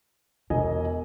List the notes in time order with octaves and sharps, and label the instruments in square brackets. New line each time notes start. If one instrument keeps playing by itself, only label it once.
[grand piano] E1 D#5 G#5 [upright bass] B2